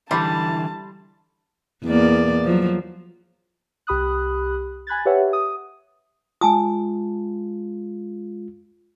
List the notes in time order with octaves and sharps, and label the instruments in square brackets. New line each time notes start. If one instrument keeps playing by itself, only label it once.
[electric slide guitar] D3 E3 [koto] G3 [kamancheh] A5 [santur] B5 C6
[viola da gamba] E2 A#3 D5
F3 F#3
[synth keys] C2 G4 B5 D#6 F#6
G#5 B5 F#6 G#6 A6
G4 B4 C#5 E5 F#5
D#6
[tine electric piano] G#3 F4 [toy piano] G#5 A5 D#6